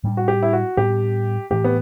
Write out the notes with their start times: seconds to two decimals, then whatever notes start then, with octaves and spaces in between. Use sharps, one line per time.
0.03 A2 G3 B3 D4
0.17 F#4
0.28 G4
0.43 E4
0.53 F#4
0.77 A2 G3 B3 D4 G4
1.51 A2 E3 A3 G4
1.64 B3